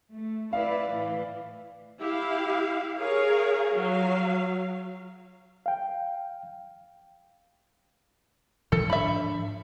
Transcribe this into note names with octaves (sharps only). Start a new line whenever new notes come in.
A3
E4 B4 D5 F5
A2 E3
E4 G4 F5
G#4 A#4 C#5 F5
F#3 F5
F5 G5
A2 E3 F3 A4
G#2 F3 D4 E5 B5